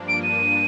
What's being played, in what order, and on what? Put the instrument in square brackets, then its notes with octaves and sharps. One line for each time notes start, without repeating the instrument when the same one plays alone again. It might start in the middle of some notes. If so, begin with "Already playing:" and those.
Already playing: [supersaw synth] G2 F3 A#3 D4
[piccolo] D7
D#7